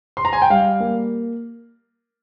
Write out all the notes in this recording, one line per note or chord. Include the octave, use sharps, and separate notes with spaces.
C6
A#5
G#5
G5
G3 F5
A#3